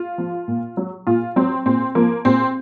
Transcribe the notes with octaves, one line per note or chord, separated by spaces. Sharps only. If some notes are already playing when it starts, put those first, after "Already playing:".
Already playing: F4
F3
A#2
F#3
A#2 F4
F#3 C4
A#2 C4
F3 A#3
A#2 C4